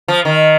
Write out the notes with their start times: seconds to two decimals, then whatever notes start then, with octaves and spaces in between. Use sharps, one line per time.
0.08 F3
0.25 D#3